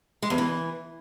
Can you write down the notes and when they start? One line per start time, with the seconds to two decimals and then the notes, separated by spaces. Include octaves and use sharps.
0.22 G#3
0.30 E2
0.38 E3